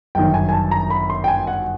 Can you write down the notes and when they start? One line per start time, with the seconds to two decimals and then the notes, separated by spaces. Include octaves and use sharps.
0.15 G1 F#2 D#3 G5
0.34 G#5
0.49 G#5
0.53 A5
0.71 A#5
0.90 B5
1.10 C6
1.24 G5
1.28 G#5
1.47 F#5